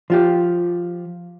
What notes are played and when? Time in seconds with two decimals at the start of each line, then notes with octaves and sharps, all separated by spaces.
0.10 F3 F4 G4